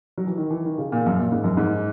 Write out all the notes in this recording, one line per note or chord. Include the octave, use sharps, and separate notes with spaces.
F#3
E3
D#3
E3
D#3
C#3
A#2
F#2
A#2
G#2
F#2
G#2